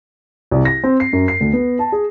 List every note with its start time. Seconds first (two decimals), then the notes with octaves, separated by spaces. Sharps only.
0.52 C2
0.65 A#6
0.84 C4
1.00 C7
1.13 F#2
1.28 C7
1.40 D2
1.53 B3
1.79 A5
1.92 G#4